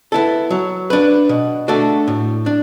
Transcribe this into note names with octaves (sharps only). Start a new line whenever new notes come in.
B3 E4 A4
F#3
D4 B4
B2
A3 D4 F#4 A4
A2
D4